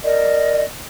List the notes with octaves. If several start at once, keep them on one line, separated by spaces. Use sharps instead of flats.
A#4 D5 D#5